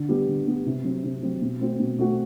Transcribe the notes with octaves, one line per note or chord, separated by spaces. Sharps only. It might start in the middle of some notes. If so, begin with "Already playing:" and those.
Already playing: D3
G3 B3
D3
G3 B3
C3
F#3 C4
C3
F#3 C4
B2
A3 C4 F#4
B2
A3 C4 F#4